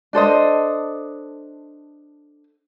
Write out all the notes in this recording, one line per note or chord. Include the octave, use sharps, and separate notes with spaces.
D4 A4 C5 D#5